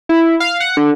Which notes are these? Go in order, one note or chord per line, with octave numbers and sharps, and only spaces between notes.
E4
F5
F#5
D3